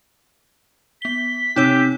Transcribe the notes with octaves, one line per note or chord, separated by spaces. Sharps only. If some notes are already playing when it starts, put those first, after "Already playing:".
B3 B6 G7
C3 D#4 G4 C#5 E6